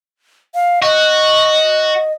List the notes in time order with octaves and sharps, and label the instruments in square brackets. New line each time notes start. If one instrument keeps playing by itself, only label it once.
[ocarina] F5
[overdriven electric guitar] F#4 [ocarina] D#5